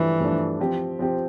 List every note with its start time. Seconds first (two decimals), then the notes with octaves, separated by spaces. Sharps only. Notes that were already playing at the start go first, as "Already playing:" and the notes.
Already playing: G2 E3 F3 A3 D4
0.20 G2 F3 A3 D4
0.59 F3 C4 G4
0.99 F3 C4 G4